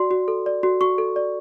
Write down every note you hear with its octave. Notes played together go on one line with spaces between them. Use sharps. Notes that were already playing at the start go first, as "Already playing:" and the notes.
Already playing: F#4 D5 C6
F#4
A4
D5
F#4
F#4 C#6
A4
D5